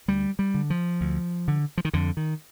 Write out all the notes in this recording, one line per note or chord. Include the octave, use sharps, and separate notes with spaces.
D2 G3
G3
D3
F3
D2
D3
F3
D#3
F2 D3
D#3